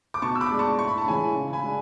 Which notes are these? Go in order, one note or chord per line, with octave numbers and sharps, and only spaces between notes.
D6
B2 A5 C#6
E6
B5 D6
G#3 D4
A5 C#6
A2 C#6
B5
A5
E3 G#3 C#4 G#5 B5
C#3
G#5 B5
G#3 D4